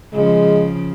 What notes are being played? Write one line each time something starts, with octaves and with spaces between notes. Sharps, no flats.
C#3 F3 G#3